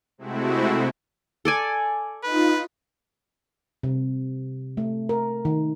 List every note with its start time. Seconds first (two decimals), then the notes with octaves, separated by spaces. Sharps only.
0.18 C3 G#3 A3 C4 E4 F#4
1.45 A4 D5 G#5
2.24 D#4 F4 B4
3.83 C3
4.77 A3
5.09 A#4
5.45 D#3